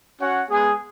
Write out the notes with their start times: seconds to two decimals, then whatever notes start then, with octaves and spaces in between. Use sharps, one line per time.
0.20 C#4 F#4 C#5 F#5
0.49 G#3 B3 G#4